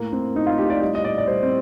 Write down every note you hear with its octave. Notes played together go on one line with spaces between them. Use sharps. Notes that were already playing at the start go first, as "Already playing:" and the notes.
Already playing: A2 A#3
A2 C4
A2 D#4
F4
A2 G4
D5
G3 D#5
D#5
A#2 D5
D5
G3 C5
C4